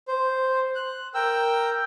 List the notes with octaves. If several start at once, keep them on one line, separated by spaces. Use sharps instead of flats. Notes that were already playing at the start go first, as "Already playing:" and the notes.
C5
F#6
A#4 G5 E6